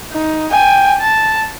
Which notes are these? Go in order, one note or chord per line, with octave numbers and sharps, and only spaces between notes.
D#4
G5 G#5
A5